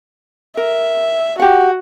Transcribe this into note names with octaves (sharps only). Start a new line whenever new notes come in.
A#4 E5
F#4 G4 F#5